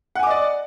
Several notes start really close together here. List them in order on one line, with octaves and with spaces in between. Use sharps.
F#5 G#5 D6 D#5 D5